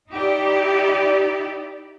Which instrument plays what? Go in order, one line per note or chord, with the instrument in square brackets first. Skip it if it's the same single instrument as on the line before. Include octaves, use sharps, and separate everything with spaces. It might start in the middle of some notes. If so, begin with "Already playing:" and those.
[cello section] D#4 E4 G4 D5